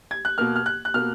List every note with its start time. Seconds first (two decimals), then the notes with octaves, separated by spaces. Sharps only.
0.11 G#6
0.25 F#6
0.38 B2 A#3 F6
0.56 F6
0.66 F#6
0.85 F#6
0.94 B2 A#3 F6